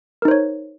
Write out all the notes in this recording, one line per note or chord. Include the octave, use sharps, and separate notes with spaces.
D#4 A#4 C5 C#5